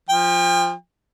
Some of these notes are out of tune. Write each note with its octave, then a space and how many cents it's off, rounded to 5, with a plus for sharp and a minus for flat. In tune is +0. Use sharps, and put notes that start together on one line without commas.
F3 +5 G5 +40